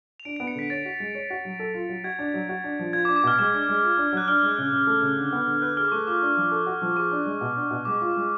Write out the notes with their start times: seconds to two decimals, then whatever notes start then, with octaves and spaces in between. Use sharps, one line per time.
0.20 F7
0.25 D4 D7
0.36 B3 D7
0.47 C#7
0.55 D3 B6
0.70 C#5 A6
0.85 F#4
1.00 G#3
1.15 C#5
1.30 F#4
1.45 F#3
1.59 A4
1.74 F4
1.89 F#3
2.04 F#4 G#6
2.19 D4
2.34 F#3
2.49 F#4
2.64 D4
2.79 F3
2.93 F4 G#6
3.05 D6
3.08 D4
3.16 D6
3.24 B2 F6
3.39 G#3 D6
3.53 D4
3.69 G#3
3.83 F4
3.98 D4
4.13 F#3 F#6
4.28 D4 F6
4.43 G#3
4.58 C#3
4.72 C#3
4.87 A3
5.02 C#3
5.17 D3
5.33 B3
5.47 D3
5.62 B4 F#6
5.77 G#4 F6
5.85 D6
5.92 A3 C#6
6.07 F4 D6
6.22 D4
6.37 F3
6.52 A4
6.66 F#4
6.82 F3
6.96 G#4 C#6
7.11 D4
7.26 G#3
7.41 B2
7.56 D4
7.71 B2
7.85 G#3 D6
8.01 F4
8.16 G#3